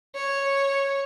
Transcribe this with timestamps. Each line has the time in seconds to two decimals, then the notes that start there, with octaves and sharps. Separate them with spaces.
0.15 C#5